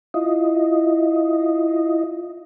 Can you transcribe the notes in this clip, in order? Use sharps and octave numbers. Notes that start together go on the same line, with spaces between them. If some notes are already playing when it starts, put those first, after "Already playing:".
E4 F4 D#5